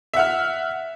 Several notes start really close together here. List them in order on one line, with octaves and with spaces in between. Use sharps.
E5 F#5 F6